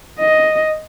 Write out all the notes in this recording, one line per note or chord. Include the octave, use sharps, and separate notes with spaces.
D#5